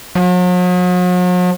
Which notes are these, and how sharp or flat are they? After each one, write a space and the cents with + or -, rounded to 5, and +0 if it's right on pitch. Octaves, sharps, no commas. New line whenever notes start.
F#3 -45